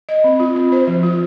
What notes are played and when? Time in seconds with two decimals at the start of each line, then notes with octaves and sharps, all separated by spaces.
0.09 D#5
0.24 C4
0.40 F4
0.56 C4
0.72 C5
0.87 F3
1.03 F4